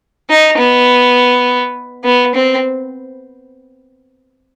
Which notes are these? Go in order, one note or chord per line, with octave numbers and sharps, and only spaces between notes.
D#4
B3
B3
C4